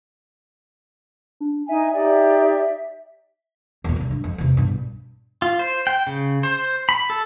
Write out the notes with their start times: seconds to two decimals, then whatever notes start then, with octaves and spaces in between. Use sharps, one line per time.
1.40 D4
1.69 D#4 E5 G#5
1.93 D#4 G4 D5
3.84 E2 A#2
3.96 C2 C#3
4.11 G2
4.24 F2
4.38 E2 C3
4.57 G2 B2
5.42 F4
5.59 C5
5.87 G5
6.07 C#3
6.43 C5
6.89 B5
7.10 A4